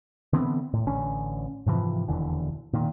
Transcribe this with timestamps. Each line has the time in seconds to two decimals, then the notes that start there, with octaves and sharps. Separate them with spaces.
0.33 D3 E3 B3 C4
0.73 A2
0.86 A1 D3 C#4
1.66 G#2 C3 E3 F3
2.08 E1 D#2 D3 E3
2.73 A#2 D#3